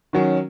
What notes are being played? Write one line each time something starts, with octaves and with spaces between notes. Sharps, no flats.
D#3 F#3 C#4